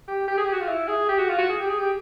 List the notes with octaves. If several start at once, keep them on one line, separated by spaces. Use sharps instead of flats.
G4
G4
G#4
G4
F#4
F4
E4
G#4
G4
F#4
F4
F#4
G#4
G4
G#4
G4